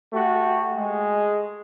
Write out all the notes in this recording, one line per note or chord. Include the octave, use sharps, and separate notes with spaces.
A3 F#4 G4
G#3